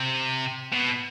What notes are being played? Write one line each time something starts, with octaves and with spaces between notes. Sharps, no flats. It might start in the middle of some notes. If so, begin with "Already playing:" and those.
Already playing: C3
B2